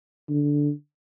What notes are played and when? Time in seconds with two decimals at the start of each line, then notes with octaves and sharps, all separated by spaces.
0.29 D3